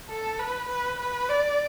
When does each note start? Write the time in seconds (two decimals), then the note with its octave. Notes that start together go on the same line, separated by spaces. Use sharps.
0.09 A4
0.39 B4
0.69 B4
0.99 B4
1.29 D5